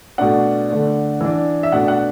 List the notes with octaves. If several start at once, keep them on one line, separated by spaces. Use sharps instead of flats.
B2 A3 D4 F#5
D3 A3 D4
E3 D4
E5
B2 A3 D4 F#5
F#5